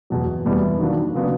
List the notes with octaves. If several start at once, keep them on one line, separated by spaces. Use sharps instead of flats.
E2 B2 F#3
E2 B2 G3 B3 E4
D#3 F#3 A#3 D4
C#3 F#3 B3 D4